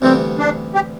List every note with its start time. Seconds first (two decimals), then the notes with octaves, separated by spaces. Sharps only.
0.02 D2 C3 E3 G3 B3 C4
0.39 D4
0.75 G4